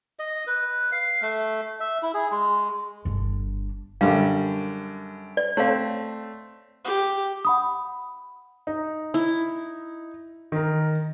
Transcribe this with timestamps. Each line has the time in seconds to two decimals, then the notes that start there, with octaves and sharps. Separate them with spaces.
0.19 D#5
0.47 B4
0.92 F5
1.22 A3
1.80 E5
2.03 E4
2.14 G#4
2.32 G#3
3.05 G1 D4
4.01 F#2 D3 G3 F5
5.37 D5
5.57 A3 C4 C#5 F5
6.85 G4
7.45 F#5 B5 D#6
8.67 D#4
9.14 E4
10.52 D#3 A#4